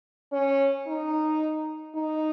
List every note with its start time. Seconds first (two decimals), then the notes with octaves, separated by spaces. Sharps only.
0.33 C#4
0.87 D#4
1.95 D#4